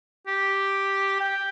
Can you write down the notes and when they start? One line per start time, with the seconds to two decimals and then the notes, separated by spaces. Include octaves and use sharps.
0.27 G4
1.20 G5